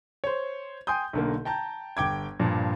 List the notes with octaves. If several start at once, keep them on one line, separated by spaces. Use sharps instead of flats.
C5 C#5
G5 G#5 C6 D#6 G6
B1 D3 A#3
G5 A5 A#5 G6
G1 G5 D6 G#6
G2 A#2 F3